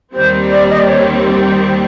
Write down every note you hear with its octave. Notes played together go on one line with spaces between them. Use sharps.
D#2 D#3 G3 C4 C5
D5
D#5
D5
C#5